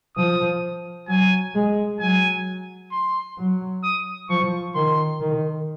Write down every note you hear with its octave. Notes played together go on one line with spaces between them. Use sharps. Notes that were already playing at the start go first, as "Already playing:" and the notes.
F3 D#6
F#3 G#5
G#3
F#3 G#5
C6
F#3
D#6
F3 C#6
D#3 C6
D#3